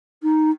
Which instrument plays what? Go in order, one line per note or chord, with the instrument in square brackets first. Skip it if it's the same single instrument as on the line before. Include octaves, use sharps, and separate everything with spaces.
[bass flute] D#4